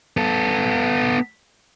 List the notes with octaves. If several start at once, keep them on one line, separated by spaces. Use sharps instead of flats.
B3 A4